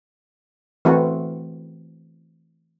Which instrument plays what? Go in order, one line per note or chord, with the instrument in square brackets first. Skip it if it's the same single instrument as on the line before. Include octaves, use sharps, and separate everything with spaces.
[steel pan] E3 A3 C4 F#4